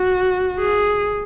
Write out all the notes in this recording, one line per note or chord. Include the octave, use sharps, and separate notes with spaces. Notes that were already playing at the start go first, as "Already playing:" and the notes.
Already playing: F#4
G#4